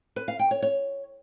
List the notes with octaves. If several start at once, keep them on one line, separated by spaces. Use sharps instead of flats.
B4
F5
G5
C#5
C#5